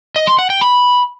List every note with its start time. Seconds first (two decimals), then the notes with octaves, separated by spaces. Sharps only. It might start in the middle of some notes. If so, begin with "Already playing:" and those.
0.16 D#5
0.27 C6
0.39 F#5
0.50 G5
0.61 B5